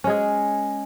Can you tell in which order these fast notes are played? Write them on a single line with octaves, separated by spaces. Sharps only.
C#4 G#3 G#4